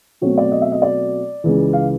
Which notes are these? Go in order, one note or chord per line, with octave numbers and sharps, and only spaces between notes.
B2 F#3 A3 C4 C#5
D5
D#5
E5
D#5
D5
C#2 C#3 E3
F5